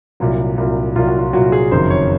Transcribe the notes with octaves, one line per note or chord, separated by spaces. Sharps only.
C2 A#2 F#3
C2 A#2 F#3
C2 A#2 F#3 F4
F#4
F4
C2 A#2 F#3 F#4
G#4
F#1 F2 D#3 F#3 C5
C#5